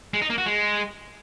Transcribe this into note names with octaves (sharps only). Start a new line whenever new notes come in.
G#3
D#4
A#3
F#4
G#3